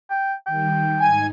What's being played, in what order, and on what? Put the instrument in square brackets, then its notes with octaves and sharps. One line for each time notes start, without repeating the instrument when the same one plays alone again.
[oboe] G5
[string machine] D#3 G3 [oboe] G5
[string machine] G#2 D#4 [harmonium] G#5